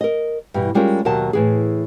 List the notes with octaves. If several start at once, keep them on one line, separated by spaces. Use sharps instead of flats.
A#4 D#5
G2 B2 E3
G3 G#3 C#4 F4 A#4
D#2 B2 F#3 A#4 A5
A2 E3 G#4